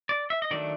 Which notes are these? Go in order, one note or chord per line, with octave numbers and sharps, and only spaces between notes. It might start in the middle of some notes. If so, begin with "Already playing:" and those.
D5
E5
D#5
D#3 F#3 A3 D4 D5